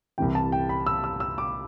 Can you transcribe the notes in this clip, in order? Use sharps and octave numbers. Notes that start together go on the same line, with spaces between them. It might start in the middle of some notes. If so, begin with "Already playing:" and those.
C2 C3 E3 G5
A5
G5
B5
E6
E6
E6
D6